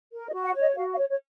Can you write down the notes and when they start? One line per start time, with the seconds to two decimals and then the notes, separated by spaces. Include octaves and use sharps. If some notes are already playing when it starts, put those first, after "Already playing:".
0.12 A#4
0.28 D#5
0.33 F#4
0.44 F#5
0.55 C#5 D#5
0.76 F#4 F5
0.93 F5
0.98 C#5
1.09 C#5